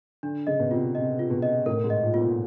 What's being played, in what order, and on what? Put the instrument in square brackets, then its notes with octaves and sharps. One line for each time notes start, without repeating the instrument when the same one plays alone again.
[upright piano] D3 [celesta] D4
[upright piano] C#3 [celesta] D#5
[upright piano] B2
[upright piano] C3 [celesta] F4
[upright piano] C3 [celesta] D#5
[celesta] F4
[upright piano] B2
[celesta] D#5
[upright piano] A2 [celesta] A#4
[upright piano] G#2
[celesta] D#5
[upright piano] A#2
[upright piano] B2 [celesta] F4
[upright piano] A#2